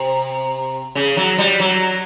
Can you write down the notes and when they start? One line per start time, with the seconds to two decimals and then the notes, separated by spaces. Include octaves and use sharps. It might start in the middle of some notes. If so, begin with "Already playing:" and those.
Already playing: C3
0.95 C#3
1.17 F#3
1.38 G3
1.60 F#3